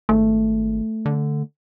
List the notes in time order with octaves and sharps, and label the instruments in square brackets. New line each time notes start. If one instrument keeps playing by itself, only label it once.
[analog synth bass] G#1 [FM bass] A3
[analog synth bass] D3